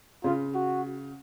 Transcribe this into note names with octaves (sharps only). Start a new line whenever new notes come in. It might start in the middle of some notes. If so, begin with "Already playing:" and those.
C#3 F4
F#4